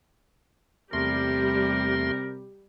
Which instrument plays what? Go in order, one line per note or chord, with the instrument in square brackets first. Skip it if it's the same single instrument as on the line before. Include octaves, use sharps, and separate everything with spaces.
[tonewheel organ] E2 A3 C6 [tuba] C3 [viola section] G3 G4 [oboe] A#4